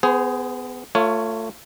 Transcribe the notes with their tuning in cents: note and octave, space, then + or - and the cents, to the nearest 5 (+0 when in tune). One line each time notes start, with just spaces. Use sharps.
B3 +25 G#4 +0 C5 -20
A3 +25 F4 +0 C#5 +0